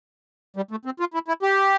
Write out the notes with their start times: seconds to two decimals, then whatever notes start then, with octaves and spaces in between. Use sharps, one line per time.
0.56 G3
0.71 A3
0.85 C4
1.00 F4
1.14 E4
1.28 E4
1.42 G4